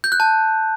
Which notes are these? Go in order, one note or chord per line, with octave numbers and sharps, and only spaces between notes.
G6
F#6
A5